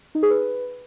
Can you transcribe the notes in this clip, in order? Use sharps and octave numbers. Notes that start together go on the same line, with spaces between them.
D#4
G#4
B4